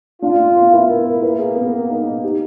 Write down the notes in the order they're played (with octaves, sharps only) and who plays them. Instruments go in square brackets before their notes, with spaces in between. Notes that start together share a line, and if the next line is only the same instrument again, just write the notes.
[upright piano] D4 [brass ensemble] F4
[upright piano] D4
B3
[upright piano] B3 [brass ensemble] E4
[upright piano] A#4
A#4
[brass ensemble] A#3 [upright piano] B4
[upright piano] G#4
B3
B3
D#4
D#4
G4